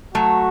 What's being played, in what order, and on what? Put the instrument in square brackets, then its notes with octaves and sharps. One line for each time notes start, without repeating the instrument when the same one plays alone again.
[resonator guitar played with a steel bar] F#3 A3 [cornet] F#4